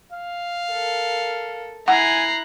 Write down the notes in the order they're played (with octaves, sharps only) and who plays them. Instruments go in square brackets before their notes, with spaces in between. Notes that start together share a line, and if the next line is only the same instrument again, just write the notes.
[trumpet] F5
[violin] A4 A#4
[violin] E4 F#6 [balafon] F#5 [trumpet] G#5 [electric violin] A#5 C7